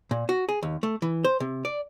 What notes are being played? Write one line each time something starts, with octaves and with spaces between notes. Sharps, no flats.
A#2
F#4
G#4
D#2
A3
E3
C5
C3
D5